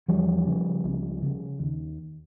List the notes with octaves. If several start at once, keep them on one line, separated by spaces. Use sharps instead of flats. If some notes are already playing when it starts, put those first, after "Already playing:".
E2 F3 G3
C#3
C#2
C#3
D#2